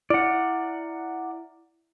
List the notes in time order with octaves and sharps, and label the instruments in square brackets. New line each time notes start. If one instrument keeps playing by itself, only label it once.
[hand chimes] E4 [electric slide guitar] D5 F#5